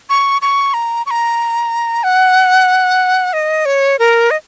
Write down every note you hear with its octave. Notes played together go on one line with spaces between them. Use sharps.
C#6
C#6
A#5
C#6
A#5
F#5
D#5
C#5
A#4
D#5